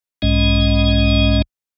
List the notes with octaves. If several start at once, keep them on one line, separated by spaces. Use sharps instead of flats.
B1 G#2 G#3 C#4 D#5